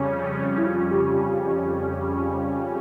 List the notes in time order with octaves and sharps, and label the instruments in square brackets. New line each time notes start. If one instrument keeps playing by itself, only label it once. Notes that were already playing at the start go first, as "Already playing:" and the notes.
Already playing: [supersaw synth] F2 C#3 G3 C#4 [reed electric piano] C#5
[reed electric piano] E4
F4
G4